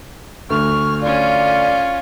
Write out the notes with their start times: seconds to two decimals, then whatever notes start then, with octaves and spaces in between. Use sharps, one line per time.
0.50 D2 C#6 F6
1.02 C#4 F4 D5